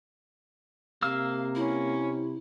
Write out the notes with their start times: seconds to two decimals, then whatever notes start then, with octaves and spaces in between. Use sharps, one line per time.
1.02 C3 A#3 F5 E6 F6
1.55 C#4 E4